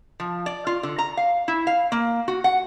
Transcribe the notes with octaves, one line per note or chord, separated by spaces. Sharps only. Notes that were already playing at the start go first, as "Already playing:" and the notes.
F3
D5
F4
D3
A#5
F5
E4
F5
A#3
F#4
F#5